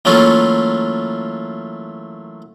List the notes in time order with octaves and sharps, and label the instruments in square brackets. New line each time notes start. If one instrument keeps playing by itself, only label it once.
[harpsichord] E3 F#3 A3 A#3 C#4 F4